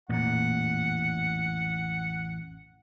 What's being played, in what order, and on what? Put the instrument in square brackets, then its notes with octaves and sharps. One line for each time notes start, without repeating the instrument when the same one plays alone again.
[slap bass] A1 F2 [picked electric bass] A#2 A#3 [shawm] F#5